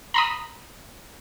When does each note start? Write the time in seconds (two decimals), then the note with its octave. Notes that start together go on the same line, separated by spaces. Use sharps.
0.14 A#5 B5 D#6